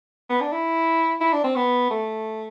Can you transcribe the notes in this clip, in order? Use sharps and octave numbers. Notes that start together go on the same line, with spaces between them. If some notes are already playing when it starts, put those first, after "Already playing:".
B3
D4
E4
E4
D4
C4
B3
A3